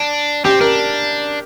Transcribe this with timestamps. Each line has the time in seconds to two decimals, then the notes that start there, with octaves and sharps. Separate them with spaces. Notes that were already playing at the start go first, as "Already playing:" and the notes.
Already playing: D4
0.45 C4 G4
0.61 D4 A#4